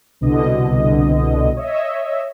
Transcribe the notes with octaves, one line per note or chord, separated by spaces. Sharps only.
C2 B2 D3 D#5
C#5 D#5 E5